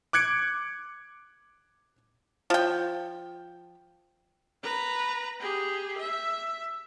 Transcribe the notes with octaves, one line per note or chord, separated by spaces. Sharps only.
D6 F#6 G#6 C#7 D7
F3 G5
B4 A#5
G4 G#4
E5